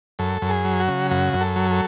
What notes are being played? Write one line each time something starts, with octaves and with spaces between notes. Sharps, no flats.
F#2 A4
F#2
G#4
F#3
F#4
C#3
F#2 F#4
F#2
A4
F#3
A4